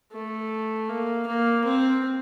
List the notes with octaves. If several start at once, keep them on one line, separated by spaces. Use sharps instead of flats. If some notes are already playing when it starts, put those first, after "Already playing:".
A3
A#3
A#3
C4